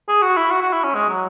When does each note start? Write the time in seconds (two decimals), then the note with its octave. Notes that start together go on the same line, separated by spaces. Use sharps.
0.09 G#4
0.22 F#4
0.37 E4
0.51 F#4
0.62 F#4
0.73 E4
0.84 C#4
0.95 G#3
1.09 F#3